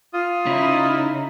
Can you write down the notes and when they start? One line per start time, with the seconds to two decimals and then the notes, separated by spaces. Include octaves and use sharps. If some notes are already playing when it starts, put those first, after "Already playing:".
0.13 F4 D#6
0.46 C#3 D#4 E4